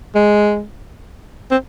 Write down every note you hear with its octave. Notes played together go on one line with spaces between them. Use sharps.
G#3
C4